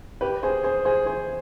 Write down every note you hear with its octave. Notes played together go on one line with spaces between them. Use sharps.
G4 B4
G#4 C5
G#4 C5
G#4 C5
G#4 C5